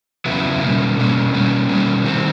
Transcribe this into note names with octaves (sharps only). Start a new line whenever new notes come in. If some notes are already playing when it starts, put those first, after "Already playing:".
E2 C#3 F#3 B3 E4
B2 G3 A#3 C#4
B2 G3 A#3 C#4
B2 G3 A#3 C#4
B2 G3 A#3 C#4
D#3 G3 C4